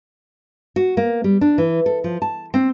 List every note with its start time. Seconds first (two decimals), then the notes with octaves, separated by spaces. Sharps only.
0.76 F#4
0.97 A#3
1.24 G3
1.41 D4
1.58 E3
1.86 A4
2.04 F3
2.22 A5
2.54 C4